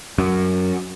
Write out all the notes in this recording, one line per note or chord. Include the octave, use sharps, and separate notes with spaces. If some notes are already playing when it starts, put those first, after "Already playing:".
F#2